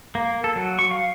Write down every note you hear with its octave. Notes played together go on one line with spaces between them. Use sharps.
A#3
A4
F#3
C#6
F5